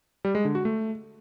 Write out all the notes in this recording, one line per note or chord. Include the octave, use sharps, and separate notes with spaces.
G3
G#3
D3
F#4
A3